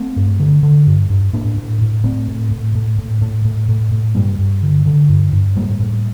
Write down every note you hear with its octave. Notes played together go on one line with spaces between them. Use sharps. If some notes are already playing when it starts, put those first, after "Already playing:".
Already playing: A3 C4
G2
D3
D3
G2
G2
A2 A#3 D4
A2
A2
A2 A3 C4
A2
A2
A2
A2
A2
A2
A2
A2
G2 G3 A#3
G2
D3
D3
G2
G2
A2 G3 A#3
A2